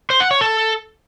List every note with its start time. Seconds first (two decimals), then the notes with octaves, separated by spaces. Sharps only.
0.10 C5
0.20 F#5
0.31 C#5
0.41 A4